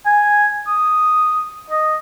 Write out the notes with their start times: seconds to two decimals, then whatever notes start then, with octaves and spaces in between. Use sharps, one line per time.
0.06 G#5
0.67 D#6
1.70 D#5